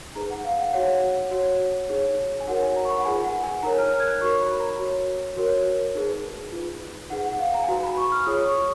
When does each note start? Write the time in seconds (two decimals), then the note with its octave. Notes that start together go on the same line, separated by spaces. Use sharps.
0.15 D#4 G#4 B4 A#5
0.30 F#5
0.45 F5
0.60 F#5
0.73 F#4 C#5 F#5
1.31 F#4 C#5
1.89 D#4 G#4 C#5
2.40 G#5
2.47 D#4 F#4 A#4 C#5 F#5
2.62 G#5
2.76 A#5
2.85 C#6
2.90 B5
2.98 F#5
3.05 F4 G#4 B4 G#5
3.24 F#5
3.43 G#5
3.63 D#4 A#4 C#5 A#5
3.78 F6
3.92 F6
4.00 G#6
4.07 F#6
4.21 F#4 A#4 C#5 C#6
4.41 B5
4.60 A#5
4.79 F#4 C#5
5.36 F#4 A#4 C#5
5.95 D#4 G#4 B4
6.52 F4 B4
7.10 D#4 G#4 B4 F#5
7.25 F#5
7.39 F5
7.54 A#5
7.63 G#5
7.68 F#4 B4 A#5
7.83 B5
7.97 C#6
8.12 F6
8.26 F4 G#4 C#5 D#6
8.45 C#6